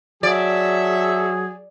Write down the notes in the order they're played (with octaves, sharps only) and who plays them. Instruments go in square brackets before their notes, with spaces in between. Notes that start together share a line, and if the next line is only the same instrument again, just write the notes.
[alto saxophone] F#3 [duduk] G#4 [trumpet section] A4 E5 [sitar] D5